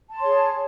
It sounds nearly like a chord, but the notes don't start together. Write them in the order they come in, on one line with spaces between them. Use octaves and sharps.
A5 C6 C#5 G#4